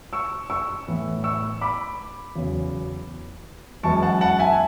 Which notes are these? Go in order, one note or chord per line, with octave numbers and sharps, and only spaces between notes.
C#6 E6
C#6 E6
A2 E3 B3
C#6 E6
B5 D6
E2 C#3 F#3 B3
F#2 E3 G#3 B3 A5 C#6
F#5 A5
F#5 A5
E5 G#5